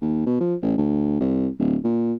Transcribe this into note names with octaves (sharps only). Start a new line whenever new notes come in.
D#2
B2
F3
A1
D2
C2
D1
A#2